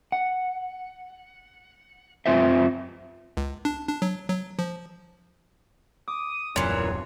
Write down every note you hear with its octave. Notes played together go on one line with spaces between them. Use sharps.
F#5
F#2 F3 C4 F4 C5 E5
C#2
D4
D4
F#3
F#3
F3
D6 D#6
D#1 F#2 A#2 E3 C#5 C6